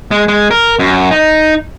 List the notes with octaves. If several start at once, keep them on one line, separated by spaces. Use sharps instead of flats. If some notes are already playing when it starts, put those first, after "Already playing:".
G#3
G#3
A#4
F#2
D#4